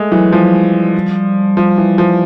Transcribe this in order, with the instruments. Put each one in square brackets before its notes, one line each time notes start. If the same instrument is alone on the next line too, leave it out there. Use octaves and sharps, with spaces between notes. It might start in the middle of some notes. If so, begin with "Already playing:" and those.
Already playing: [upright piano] G#3 A3
[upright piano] E3 [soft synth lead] F#3
[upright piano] F3 [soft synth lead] G3
[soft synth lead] F#3
G3
[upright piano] F3
E3
F3